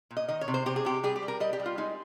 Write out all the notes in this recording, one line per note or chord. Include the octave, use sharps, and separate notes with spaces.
A#2
D#5
D#3 D#5
C#5
C3
C5
C3 G4
G#4
C3 G4
G3 G#4
G4
G3
A#4
G3 D#5
G4
G3
F4
G#3 D#4